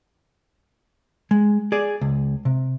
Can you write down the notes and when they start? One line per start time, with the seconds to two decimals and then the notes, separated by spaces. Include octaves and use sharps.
1.31 G#3
1.72 G#4 D5
2.01 C#2
2.45 C3